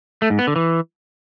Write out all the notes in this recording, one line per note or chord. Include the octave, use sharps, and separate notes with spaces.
A3
G#2
B3
D3
E3